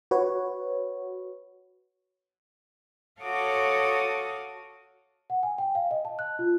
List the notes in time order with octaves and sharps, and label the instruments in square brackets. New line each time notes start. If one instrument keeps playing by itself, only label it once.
[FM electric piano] F#4 B4 C#5
[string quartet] F#4 A4 C#5 F5 D6 D#6
[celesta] F#5
G#5
G5
F5
D#5
A5
F#6
F4